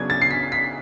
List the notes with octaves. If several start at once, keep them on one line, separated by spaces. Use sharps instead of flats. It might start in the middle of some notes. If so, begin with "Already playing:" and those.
Already playing: C#3 F#3 B3 D4 G#6
A6
C7
B6
B6